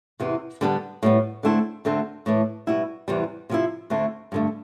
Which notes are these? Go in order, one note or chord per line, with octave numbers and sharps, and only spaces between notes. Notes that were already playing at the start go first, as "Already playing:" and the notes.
E2 C3 E3
D3 G3 B3 D4
A2 G3 B3
D3 A3 C4 E4
D2 D3 A3 C4
A2 E3 A3
B2 G3 B3 E4
E2 C3 E3 G3
C3 F3 C4 E4
D2 D3 A3 C4 E4
G2 D3 A3